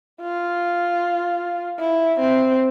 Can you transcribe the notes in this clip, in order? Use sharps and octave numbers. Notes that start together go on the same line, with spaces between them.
F4
E4
C4